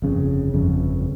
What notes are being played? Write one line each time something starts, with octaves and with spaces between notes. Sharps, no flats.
G1 F2 C#3
G1 F2 C#3